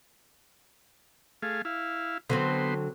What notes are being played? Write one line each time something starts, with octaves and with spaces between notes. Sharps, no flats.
A3 G#4 F5
E4 F5
D3 F#3 B3 C4 C5